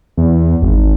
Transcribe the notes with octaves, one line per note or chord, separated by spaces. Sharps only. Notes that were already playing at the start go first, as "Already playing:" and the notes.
E2
G#1